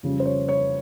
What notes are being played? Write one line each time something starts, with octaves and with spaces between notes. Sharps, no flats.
F2 C#3 G3
C5
C#5
C#5